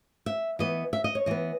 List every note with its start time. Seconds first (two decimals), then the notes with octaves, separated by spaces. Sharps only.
0.26 E5
0.59 E3 B3 D#5
0.93 E5
1.04 D#5
1.15 C#5
1.26 E3 B3 D#5